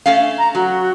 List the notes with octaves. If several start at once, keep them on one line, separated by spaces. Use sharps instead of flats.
A3 C#4 F5
A#5
F#3 F#4